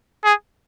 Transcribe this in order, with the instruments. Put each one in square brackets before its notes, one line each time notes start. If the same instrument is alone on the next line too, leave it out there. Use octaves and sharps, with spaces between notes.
[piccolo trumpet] G#4